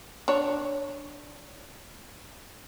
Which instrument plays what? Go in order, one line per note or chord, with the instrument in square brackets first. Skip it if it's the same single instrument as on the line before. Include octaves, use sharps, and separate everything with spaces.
[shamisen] D4 C#5